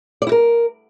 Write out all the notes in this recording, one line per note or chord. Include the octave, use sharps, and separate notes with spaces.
D5
E4
A#4